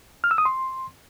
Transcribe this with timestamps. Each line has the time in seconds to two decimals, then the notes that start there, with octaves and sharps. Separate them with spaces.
0.24 F6
0.31 E6
0.38 D#6
0.45 C6